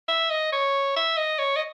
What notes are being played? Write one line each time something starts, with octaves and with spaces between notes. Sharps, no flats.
E5
D#5
C#5
E5
D#5
C#5
D#5